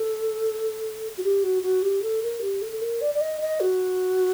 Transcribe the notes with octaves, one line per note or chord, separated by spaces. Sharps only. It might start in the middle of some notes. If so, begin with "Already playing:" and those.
Already playing: A4
F#4
G4
F#4
F#4
G4
A4
A#4
G4
A4
A4
A#4
D5
D5
D#5
D#5
F#4